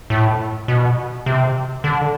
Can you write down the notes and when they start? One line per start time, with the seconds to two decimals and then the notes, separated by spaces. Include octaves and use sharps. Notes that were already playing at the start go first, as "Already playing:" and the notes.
0.10 A2
0.68 B2
1.26 C3
1.84 D3